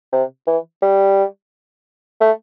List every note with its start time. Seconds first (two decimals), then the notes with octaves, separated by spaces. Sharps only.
0.13 C3
0.47 E3
0.82 G3
2.21 A3